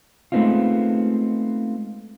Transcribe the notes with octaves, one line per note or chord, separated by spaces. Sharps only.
G#3 A3 B3 C4 D#4 F4